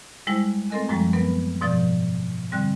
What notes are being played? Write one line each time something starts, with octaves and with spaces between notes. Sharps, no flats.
G3 G#3 E4 C5
A3 C4 A4 A#4 D#5 G#5
F#2 A2 F3 G3 G#3
F#3 B3 A#4 B4
G#2 B2 F3 D5 G6
D3 G3 C4